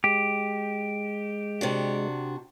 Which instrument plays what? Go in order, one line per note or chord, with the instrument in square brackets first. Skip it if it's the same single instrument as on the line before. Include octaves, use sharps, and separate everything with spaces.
[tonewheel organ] G#3 [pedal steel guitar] G4
[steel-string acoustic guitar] C3 D4 F#4